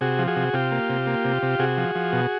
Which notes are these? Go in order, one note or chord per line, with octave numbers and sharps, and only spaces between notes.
C3 F#4 G#4
F3
F#4 G#4
C3
C3 F4 G4
A#3
C3
A#3
C3
C3
C3 F#4 G#4
F3
F3
B2